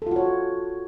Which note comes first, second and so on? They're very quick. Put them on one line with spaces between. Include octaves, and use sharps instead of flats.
A4 F4 F#4 C#5